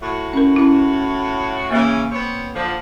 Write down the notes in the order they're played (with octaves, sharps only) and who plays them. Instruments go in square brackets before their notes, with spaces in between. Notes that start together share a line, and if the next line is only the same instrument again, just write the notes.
[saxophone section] A2 F#4
[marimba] C#4 A#4
C#4 E4
[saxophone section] C#3 E3 [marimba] A#3
[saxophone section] B3 C4 C#5
D3 F3